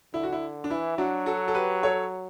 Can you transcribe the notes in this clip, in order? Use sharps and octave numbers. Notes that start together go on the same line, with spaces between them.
D3 E4
F#4
E4
D4
E3 E4
F#3 D4 F#4
F#4 A4
A4
G4 B4
A4 C#5